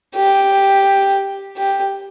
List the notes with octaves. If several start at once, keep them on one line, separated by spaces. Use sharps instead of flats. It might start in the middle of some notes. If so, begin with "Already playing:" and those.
G4
G4